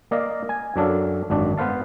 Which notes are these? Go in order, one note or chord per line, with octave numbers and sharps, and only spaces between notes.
A#3 D5 D#5 F5
G#5
F#2 F#3 D4 A4 F5
G#1 F#2 D4
B3 B4 C5 F5 A5